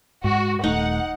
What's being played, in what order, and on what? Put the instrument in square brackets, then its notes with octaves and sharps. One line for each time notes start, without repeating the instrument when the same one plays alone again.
[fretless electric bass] G#2 [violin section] F#4
[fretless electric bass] D#1 A3 [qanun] D#4 [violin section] F#5